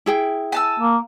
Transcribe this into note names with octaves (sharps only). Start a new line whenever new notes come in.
E4 G#4 G5
G#5 A5 E6
A#3